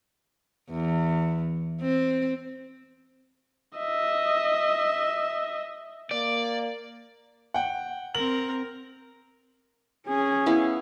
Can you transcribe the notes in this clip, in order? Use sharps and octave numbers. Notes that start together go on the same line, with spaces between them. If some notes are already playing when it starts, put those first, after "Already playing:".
E2
C4
D#5 E5
A#3 D5
F#5 G5
C4 A#4 F#7
C#4 G#4
B3 E4 F5